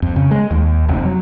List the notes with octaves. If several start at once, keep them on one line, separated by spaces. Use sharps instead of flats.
F2
C#3
G#3
D#2
F1
F#3